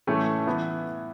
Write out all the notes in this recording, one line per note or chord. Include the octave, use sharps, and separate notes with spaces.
A2 E3 A3 C#4
E3 B3 E4